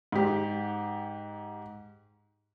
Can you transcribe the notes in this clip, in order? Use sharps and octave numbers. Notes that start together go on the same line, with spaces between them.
G#2 G4